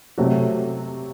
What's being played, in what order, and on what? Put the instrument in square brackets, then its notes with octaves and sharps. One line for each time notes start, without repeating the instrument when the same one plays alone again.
[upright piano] C3 F#3 A3 C4 F#4